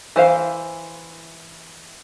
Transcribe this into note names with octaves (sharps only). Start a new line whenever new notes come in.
E3 C5 F5